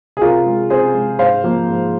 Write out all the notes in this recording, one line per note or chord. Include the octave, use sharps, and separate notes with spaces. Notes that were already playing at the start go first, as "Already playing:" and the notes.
G#4
C3 F4 A#4
G#3
C3 G#4 C5
G#3
G#2 C5 F5
F3 A#3
G#2